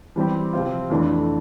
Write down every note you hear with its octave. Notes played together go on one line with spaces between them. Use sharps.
E3 G3 C4 G4
C3 F3 C4 F4
F2 E3 A3 D4